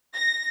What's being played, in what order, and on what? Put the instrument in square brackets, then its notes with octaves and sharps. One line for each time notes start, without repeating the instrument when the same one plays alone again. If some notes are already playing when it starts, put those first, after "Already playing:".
[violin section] A#6